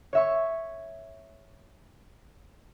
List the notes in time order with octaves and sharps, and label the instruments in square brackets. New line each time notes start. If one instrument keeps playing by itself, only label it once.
[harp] C#5 E5 C#6